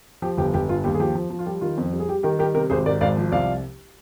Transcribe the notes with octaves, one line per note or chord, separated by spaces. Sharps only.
F3 G4
G1 G4
G1 G4
G2 F4
D#2 G4
G#4
F3 G4
F3
F3
F4
G3 G4
D#3 F4
F2
G3
G#4
G3 G4
D#3 G4 A#4
G3 G4 A#4
C3 G4 A#4
G#1 G#4 C5
G#2 A#4 D5
G#1 D5 F5
F3
C2 D5 F5